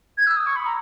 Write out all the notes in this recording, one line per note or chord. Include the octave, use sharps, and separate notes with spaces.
G#6
E6
D#6
C#6
B5
A#5